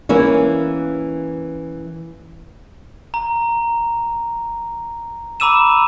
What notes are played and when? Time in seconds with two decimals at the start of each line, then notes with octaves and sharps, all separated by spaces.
0.09 E3 A#3 C#4 E4
3.14 A#5
5.40 A#5 B5 D6 E6 D#7 E7